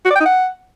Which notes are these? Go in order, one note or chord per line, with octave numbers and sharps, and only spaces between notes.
F#4
D5
G5
D#4
F#5